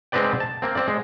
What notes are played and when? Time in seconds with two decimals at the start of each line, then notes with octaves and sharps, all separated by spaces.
0.12 G#3 C4 D#4 B4 D5 G5
0.40 A5
0.62 A#3 C4
0.75 C4 D5
0.88 G#3